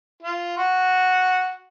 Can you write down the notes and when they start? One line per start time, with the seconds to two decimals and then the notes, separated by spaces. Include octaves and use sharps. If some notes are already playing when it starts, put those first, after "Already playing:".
0.23 F4
0.57 F#4